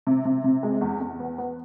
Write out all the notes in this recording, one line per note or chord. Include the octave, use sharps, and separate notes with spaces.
C3
C3
C3
G#3
E2
E2
B3
B3